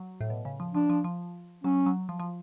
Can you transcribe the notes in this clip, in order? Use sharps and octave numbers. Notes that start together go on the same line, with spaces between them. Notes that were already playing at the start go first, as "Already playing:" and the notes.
Already playing: F#3
A2
B2
C#3
F3
F3 D4
F3
F3
F#3 C#4
F#3
F3
F3